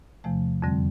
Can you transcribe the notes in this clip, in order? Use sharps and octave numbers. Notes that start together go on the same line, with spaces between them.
E2 C3 F3 A3
F2 D3 G3 C4